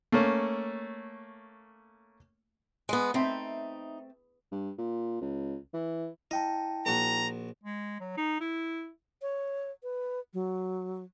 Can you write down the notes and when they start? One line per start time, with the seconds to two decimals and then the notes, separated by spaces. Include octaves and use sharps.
0.12 A3 A#3 C#4
2.89 G#3 B3
3.14 A3 C4 D#4 E5
4.52 G2
4.78 A#2
5.21 C#2
5.74 E3
6.31 E4 D#5 G5 A5
6.86 A#1 F#4 A#5
7.63 G#3
8.00 F#3
8.17 D#4
8.40 E4
9.22 C#5
9.83 B4
10.34 F#3